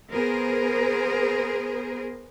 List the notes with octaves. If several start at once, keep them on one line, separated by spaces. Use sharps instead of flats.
B3 G#4 A#4 C5